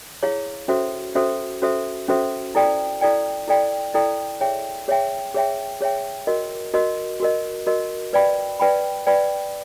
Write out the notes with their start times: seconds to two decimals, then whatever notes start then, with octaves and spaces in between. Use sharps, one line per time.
0.23 E4 G#4 C#5 F5
0.68 C#4 F#4 A4 C5 E5
1.15 C#4 F#4 A4 C5 E5
1.62 C#4 F#4 A4 C5 E5
2.08 C#4 F#4 A4 C5 E5
2.55 E4 A4 D5 G5
3.01 E4 A4 D5 G5
3.48 E4 A4 D5 G5
3.94 E4 A4 D5 G5
4.41 G#4 C#5 E5 G5
4.88 G#4 C#5 E5 G5
5.34 G#4 C#5 E5 G5
5.81 G#4 C#5 E5 G5
6.27 F#4 A#4 D#5
6.74 F#4 A#4 D#5
7.20 F#4 A#4 D#5
7.67 F#4 A#4 D#5
8.13 B4 D5 G5 B5
8.60 B4 D5 G5 B5
9.07 B4 D5 G5 B5